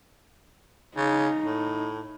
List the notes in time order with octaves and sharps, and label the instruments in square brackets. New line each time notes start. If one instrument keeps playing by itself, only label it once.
[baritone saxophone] C#3 [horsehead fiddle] D#4
[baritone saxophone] A2